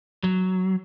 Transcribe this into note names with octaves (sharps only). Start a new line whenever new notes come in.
F#3